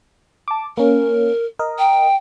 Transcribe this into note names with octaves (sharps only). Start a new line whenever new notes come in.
A5 D6
A#3 C#4 A#4
A#4 D#5
G5